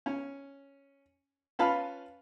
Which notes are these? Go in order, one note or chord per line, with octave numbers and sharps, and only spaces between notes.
C#4
C#4 F4 B4 F5 A5 B5